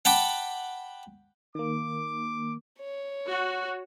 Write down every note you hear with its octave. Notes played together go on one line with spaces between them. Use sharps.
F#5 G5 A5 B5 D6
D#3 A#3 D6
C#5
F#4